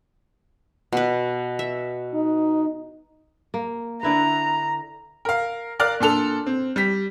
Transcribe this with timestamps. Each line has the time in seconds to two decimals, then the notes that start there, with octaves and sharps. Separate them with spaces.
0.92 B2 B4
1.59 E5
2.14 D#4
3.54 A#3
4.03 D3 E4 B4 A#5
5.25 A#4 F5
5.79 A#4 D5 F5 F6 F#6
6.00 A#2 D4 A4 F7
6.46 C4
6.76 G3 B6